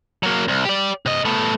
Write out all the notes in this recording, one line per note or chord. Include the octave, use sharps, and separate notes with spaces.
F#3 A#3
C2
G4 D5
C3 D#5
A3 B3